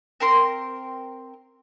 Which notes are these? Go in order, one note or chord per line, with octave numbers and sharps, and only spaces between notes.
C4 A#4 C6